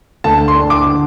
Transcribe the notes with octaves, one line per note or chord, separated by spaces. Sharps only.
D2 A5
C6
D4
D6
D3